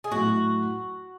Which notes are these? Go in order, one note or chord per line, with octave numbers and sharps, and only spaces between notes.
G#4
A2 F#3 A3 F#4